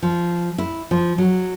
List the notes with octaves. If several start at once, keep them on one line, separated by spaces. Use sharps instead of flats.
F3
E4
F3
F#3